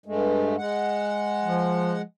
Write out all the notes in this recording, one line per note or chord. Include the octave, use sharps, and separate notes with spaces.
G2 G#3 A3
G#3 F#5
F3